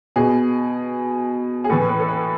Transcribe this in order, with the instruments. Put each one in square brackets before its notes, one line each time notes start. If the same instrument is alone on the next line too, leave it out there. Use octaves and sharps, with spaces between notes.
[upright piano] B2 G#4
G#4
A2 E3 A4
B4
A4
B4